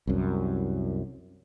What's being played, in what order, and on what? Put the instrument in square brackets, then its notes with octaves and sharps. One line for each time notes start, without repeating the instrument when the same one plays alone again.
[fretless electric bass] C2 F#2